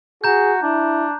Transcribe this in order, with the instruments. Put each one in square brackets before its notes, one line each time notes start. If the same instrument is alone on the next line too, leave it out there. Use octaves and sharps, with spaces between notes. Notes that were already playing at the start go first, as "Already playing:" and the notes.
[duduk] F#4 [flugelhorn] G#4 [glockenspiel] A#5 G6
[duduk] D4 [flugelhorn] E4